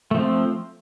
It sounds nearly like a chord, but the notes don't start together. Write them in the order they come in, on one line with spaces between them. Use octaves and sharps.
A3 F3 C4